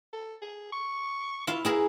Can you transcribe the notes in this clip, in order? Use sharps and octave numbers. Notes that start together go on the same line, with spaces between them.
A4
G#4
C#6
E4 F4 F5
E4 G#4 A#4 B4